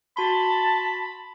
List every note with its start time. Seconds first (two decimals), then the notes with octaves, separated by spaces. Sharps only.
0.17 F#4 A5 B5 C6